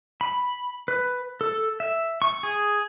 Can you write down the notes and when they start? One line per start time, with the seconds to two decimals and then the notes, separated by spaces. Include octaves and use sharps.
0.21 B5
0.88 B4
1.41 A4
1.80 E5
2.22 C#6
2.43 G#4